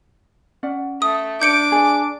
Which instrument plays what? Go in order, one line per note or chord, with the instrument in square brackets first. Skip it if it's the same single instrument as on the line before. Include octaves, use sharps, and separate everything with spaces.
[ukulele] C#4 D5 F#5
[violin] A3 [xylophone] D#6
[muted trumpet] D4 [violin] D6 [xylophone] G6 C#7 D7
[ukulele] G#4 D5